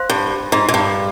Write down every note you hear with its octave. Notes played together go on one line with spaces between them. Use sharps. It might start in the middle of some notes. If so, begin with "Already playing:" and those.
Already playing: C5 F5 C6
G2
G#2
G#2
G2